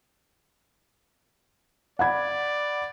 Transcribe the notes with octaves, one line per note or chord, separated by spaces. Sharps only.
D5 F#5 B5 G#6